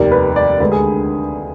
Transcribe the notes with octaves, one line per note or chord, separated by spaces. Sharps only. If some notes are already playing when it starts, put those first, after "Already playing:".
Already playing: F1 D#2 D#3 D5
B4
D5
D2 D3 G#3 B4
G#4